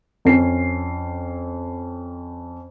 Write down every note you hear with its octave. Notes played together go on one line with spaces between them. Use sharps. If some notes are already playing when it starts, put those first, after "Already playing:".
F2 C#4 C7